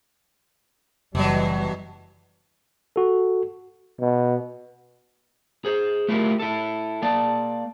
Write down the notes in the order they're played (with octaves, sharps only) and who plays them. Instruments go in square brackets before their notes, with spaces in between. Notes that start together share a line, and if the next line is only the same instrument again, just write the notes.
[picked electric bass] F#1 [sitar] B2 F#3 [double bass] E3 G3
[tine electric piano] F#4 A4
[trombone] B2
[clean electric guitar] G#4 C5
A3 E4 F4 G4 A#4
E4 A4
A#3 D5 A5